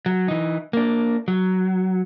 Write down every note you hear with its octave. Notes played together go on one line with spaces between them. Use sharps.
F#3
E3 D#4
A#3 D4
F#3